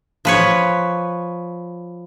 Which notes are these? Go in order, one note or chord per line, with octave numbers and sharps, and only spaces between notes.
F3 B4 C#5